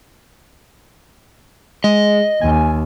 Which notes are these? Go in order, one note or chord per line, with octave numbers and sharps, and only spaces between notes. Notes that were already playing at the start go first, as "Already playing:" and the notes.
G#3 D#5
D#2 G#5